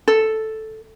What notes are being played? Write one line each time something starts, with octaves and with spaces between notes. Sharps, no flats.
A4